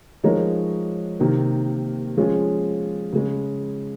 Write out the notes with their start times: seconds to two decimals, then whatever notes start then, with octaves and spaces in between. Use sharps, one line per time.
0.24 F3 G#3 D#4 A#4 C#5
1.20 C3 D#3 A#3
2.17 F3 G#3 C#4 F4 G#4
3.13 C#3 G#3 C#4